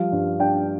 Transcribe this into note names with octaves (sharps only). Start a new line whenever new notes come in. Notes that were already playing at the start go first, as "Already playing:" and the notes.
Already playing: F3 G3 F5
G2
D4 G5